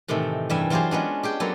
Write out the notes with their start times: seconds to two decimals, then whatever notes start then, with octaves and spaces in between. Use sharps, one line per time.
0.08 A2 C3 D#3 E3 A3
0.50 E2 G2 G3 E5 G#5
0.70 E3 F#3 F4 G4 G#4 C5
0.91 G#3 B3 C#4 D4
1.23 G4 G#4 G5
1.40 F#3 G#3 A#3 B3 A4